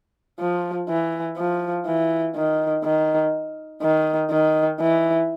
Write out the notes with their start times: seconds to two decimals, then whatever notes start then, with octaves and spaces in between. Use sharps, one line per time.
0.39 F3
0.89 E3
1.37 F3
1.86 E3
2.35 D#3
2.84 D#3
3.82 D#3
4.31 D#3
4.80 E3